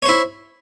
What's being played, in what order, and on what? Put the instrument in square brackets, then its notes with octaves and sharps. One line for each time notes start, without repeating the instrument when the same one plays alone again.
[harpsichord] C#5
C5
E4